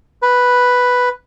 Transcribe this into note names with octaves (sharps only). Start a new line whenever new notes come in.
B4